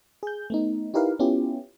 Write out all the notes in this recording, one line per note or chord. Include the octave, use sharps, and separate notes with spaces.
G#4 G6
A3 B3 D#4
D#4 E4 G4 A#4 B4 F5
B3 C#4 E4 F4 G4